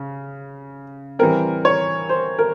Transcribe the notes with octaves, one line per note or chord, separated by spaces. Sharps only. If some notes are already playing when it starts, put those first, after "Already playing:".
Already playing: C#3
E3 G3 C4 A#4
C#5
C5
A#4